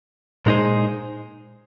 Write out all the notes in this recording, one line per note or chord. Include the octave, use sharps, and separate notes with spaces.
A#2 G#3 D#4 G#4 C5